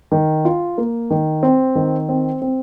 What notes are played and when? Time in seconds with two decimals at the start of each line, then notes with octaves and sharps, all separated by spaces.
0.12 D#3
0.45 F4
0.78 A#3
1.10 D#3
1.43 C4
1.75 D#3
2.09 C4
2.42 C4